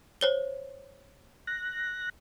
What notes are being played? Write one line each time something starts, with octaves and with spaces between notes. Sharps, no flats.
C5 C#5 G7
F#6 A#6